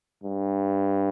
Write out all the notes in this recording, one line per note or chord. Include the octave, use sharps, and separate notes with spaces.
G2